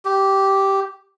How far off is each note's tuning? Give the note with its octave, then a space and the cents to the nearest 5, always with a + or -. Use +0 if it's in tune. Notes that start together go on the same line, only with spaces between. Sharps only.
G4 -10